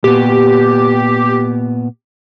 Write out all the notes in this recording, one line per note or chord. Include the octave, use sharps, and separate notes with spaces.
A#2 B3 G4